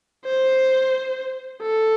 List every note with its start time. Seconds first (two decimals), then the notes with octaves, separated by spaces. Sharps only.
0.25 C5
1.63 A4